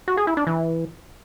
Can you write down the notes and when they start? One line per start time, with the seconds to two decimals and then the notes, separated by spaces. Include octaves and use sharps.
0.08 F#4
0.17 G#4
0.27 E4
0.37 D4
0.47 E3